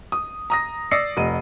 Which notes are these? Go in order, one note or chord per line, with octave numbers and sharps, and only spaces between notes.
D#6
A#5 D#6 A#6
D5 D#6 E6 A#6 C7 C#7
F1 D#5 D#7